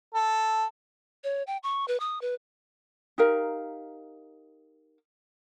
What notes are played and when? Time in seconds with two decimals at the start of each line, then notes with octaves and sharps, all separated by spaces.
0.14 A4
1.24 C#5
1.47 G5
1.63 C#6
1.88 B4
2.00 D#6
2.21 B4
3.18 D#4 G4 A#4 F5